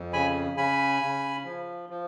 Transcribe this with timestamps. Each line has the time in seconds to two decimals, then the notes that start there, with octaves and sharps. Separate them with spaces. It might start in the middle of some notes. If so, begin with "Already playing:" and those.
Already playing: F2
0.13 C#3 G#5 B5
0.57 C#3 G#5 B5
1.02 C#3
1.45 F3
1.90 F3